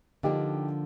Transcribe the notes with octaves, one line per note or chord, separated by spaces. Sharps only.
D3 F3 A#3 D4 D#4 G4